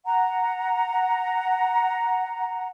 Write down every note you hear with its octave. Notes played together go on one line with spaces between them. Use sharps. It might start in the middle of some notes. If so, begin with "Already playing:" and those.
F#5 A#5